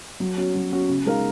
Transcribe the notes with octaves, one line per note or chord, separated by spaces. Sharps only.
F#3
C#4 F#4
F#3
C#4 F#4
C#3
G#3 D#4 A#4 F5